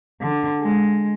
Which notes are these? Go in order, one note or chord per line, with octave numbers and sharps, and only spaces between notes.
D3
G#3